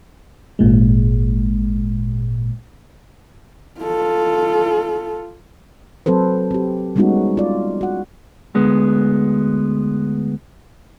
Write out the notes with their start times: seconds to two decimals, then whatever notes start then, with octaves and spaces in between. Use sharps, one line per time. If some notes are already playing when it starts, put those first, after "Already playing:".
0.59 G#1 A#2 G#3
3.81 F4 A4
6.06 F#3 C4 A4 B4 C5
6.51 C4 G4
6.96 G3 G#3 B3 C#4 D#4 F#4
7.37 F4 D5
7.81 F#4 F#5
8.55 D2 G#3 B3